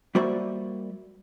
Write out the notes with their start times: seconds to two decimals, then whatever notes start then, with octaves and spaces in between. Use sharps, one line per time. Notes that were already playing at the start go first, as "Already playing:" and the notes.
0.15 G3 A#3 F#4 C5 D5 E5